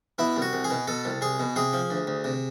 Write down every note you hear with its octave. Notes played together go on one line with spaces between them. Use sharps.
B2 E4
C2
F#4
C2
G#4
B2
B2 A4
C2
C2 G#4
B2
C3 G#4
F3
D2
D2
C3